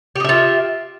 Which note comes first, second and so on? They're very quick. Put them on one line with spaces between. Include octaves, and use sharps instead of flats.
G4 D#5 E5 F4